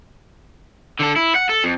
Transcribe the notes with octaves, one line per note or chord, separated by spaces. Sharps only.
D3 A4
E4
F#5
A4
F2